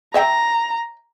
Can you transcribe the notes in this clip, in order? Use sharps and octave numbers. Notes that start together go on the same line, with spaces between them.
C#5 E5 G5 A#5